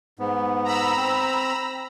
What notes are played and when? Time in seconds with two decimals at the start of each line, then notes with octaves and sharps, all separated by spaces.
0.19 G#2 B3
0.65 A#5 B5 E6
0.97 C4